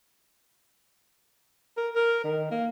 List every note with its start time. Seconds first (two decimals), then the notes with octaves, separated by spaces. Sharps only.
1.77 A#4
1.95 A#4
2.24 D#3
2.51 A#3